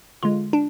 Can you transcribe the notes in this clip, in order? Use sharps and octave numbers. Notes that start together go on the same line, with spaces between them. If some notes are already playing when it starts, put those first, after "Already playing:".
D3 G#3 F4
D4